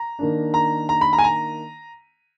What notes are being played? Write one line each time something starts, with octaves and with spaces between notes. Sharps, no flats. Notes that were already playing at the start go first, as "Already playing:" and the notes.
Already playing: A#5
D#3 A#3 D4
A#5
A#5
B5
A#5
G#5
A#5